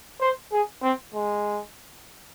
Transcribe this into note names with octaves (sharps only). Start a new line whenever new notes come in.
C5
G#4
C4
G#3